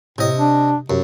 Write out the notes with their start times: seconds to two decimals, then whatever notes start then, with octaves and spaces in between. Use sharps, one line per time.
0.18 A2 C3 D#5
0.36 D4
0.90 F#2 C3